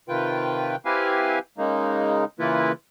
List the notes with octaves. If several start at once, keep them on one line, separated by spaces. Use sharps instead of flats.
C3 D#3 F4 B4 G5
C4 E4 G4 B4 F5 G#5
C#3 G#3 A#3 D#4
C#3 E3 A#3 E4 F4 B4